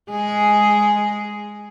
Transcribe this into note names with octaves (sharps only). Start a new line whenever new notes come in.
G#3 G#4